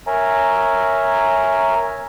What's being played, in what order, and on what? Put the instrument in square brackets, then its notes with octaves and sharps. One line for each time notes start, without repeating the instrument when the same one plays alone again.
[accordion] A#4 C#5 E5 G#5 A#5